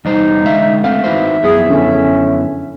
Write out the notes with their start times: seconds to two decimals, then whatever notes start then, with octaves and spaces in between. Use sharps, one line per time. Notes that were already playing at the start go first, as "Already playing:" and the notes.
0.05 E2 G3 D#4 C5
0.45 D3 G#3 E5 F5
0.84 A3 C4 E5 F5
1.04 E3 D#4 F#4 C5
1.44 F#2 B3 E4 G#4
1.70 D3 C#4